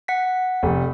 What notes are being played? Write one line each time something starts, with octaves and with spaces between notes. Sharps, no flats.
F#5 B6
F1